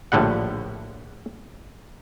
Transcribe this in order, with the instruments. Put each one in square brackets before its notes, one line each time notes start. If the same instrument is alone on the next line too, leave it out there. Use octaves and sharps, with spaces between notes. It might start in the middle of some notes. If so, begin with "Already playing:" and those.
[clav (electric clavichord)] A#1 A2 D3 G3 F#5